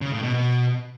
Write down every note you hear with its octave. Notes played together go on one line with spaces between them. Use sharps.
C#3
A2
B2
B2